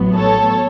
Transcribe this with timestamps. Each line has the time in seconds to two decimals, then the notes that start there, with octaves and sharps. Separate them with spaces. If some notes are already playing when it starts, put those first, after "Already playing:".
Already playing: A1 A2 F#3 B3
0.15 A4 C#5